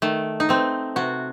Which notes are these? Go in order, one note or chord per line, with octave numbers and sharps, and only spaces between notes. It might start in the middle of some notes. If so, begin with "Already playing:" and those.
D#3 A3
D#4
A3 C4
C3 F#4